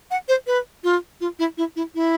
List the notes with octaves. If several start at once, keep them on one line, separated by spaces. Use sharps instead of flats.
F#5
C5
B4
F4
F4
E4
E4
E4
E4